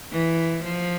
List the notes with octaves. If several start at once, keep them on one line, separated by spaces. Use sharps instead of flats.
E3
F3